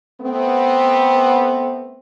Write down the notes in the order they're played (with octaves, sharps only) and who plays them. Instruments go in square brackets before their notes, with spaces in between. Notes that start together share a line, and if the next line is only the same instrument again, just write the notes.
[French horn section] A3 B3 C4